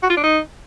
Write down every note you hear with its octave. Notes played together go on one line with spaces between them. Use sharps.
F#4
F4
D4
D#4